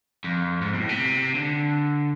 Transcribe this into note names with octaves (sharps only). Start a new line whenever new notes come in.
F2
G#2
B2
A2
C3
D3